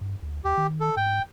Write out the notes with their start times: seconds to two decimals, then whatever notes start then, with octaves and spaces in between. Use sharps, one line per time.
0.01 G2
0.23 D2
0.45 D#2 G4
0.57 D#3
0.80 A4
0.97 G#2 G5